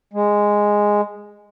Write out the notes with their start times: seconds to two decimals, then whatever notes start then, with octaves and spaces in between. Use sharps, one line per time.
0.14 G#3